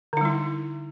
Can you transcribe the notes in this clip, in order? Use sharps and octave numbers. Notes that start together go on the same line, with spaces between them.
D3 G3 D#4 E4